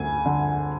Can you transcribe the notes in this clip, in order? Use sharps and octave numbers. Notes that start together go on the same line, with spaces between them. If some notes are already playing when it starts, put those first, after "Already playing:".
Already playing: D2 G#5
D3